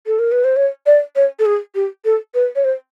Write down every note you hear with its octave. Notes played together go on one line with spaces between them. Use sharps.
A4
A#4
B4
C5
C#5
D5
C#5
A4
G#4
G4
A4
B4
C#5
C5